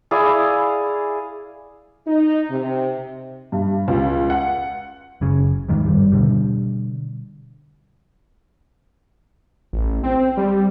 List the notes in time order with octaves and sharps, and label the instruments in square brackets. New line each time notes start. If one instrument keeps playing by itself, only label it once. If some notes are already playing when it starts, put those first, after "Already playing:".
[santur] E4 G#4 D5 F5
[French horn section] D#4
C3
[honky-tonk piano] G2
C#2
F#5
[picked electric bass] F#1 C#3 C#4
E2 G#2 D#3 E3
G#1 G2 G3
B2 D3 G3
[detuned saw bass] A1
C4
G3